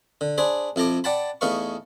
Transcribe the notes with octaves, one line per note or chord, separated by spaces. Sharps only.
D3
D4 G#4 C5 B5
F2 E4 A4 A#5 D6
D5 F#5 G5 A5 B5
E2 A3 D#4 B4 F5 C#6